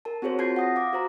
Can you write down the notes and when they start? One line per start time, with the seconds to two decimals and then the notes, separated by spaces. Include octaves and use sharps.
0.05 A#4 A5
0.22 C4 F#4 G#4 C5 C#5
0.38 C4 F4 A5 G6 G#6 C7
0.56 F#5 D#6 A#6
0.76 F5 D6
0.93 F#4 C5 A#5